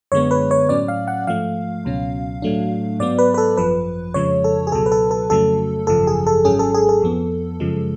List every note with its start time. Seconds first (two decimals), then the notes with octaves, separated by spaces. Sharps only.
0.12 F#2 D3 G#3 B3 C#5
0.31 B4
0.51 C#5
0.69 A2 F#3 C#4 D5
0.88 F5
1.08 F#5
1.27 G#2 F3 A3 F5
1.85 C#2 B2 F#3 C#4
2.42 A2 F#3 A3 D4
2.99 G#2 F#3 B3 D5
3.19 B4
3.34 B4
3.38 A4
3.57 G#1 F#2 F3 B4
4.14 F2 C#3 F3 G#3 C#5
4.44 A4
4.67 G#4
4.72 C#2 B2 F#3 A4
4.86 B4
4.92 A4
5.11 A4
5.30 F2 C#3 F#3 A3 A4
5.87 G#1 F#2 C#3 F3 A4
6.07 G#4
6.27 A4
6.45 G#1 G#2 F#3 C#4 G#4
6.59 A4
6.74 G#4
6.89 A4
7.02 F2 F3 B3
7.60 F#2 C#3 F3 G#3